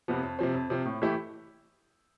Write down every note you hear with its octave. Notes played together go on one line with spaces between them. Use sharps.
F2 C3 F3 B3
F2
C3 F3 C4
F2
C3 F3 C4
A2
E3 A3 E4 G4